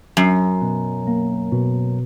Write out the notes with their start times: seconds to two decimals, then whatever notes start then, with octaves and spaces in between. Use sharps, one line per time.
0.17 F#2 F#3
0.62 B2
1.07 A#3
1.52 B2